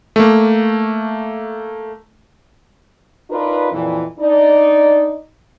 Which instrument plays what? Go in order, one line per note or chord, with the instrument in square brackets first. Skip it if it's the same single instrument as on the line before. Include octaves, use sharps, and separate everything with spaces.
[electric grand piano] A3 A#3
[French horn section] D4 D#4 F4 A#4 B4
F2 A#2 E3
D4 D#4 D5